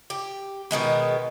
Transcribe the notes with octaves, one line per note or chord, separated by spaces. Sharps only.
G4
B2 D#3 G#3 B3